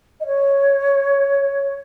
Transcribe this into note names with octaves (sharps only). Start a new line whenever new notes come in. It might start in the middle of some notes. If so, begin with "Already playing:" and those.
D#5
C#5